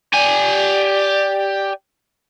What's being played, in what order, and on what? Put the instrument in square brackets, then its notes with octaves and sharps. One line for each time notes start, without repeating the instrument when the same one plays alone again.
[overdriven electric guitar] G4 G#5 [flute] D5